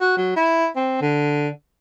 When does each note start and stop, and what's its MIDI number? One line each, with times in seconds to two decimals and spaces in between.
0.01 0.16 66
0.17 0.32 54
0.36 0.68 64
0.76 0.98 60
1.01 1.49 50